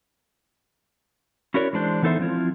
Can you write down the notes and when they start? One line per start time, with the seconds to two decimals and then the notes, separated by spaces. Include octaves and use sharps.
1.54 C#4 E4 F#4 A#4 C#5 D5
1.73 E3 G#3 D4 C5
2.03 E3 B3 D#4 A4 C5 E5
2.19 F3 C4 E4 F4